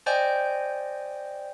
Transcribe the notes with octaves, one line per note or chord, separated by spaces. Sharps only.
C5 D5 D#5 G5 G#5 G6